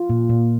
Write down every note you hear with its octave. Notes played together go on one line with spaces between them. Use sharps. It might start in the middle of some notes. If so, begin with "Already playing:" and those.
Already playing: F4
A#2
A#2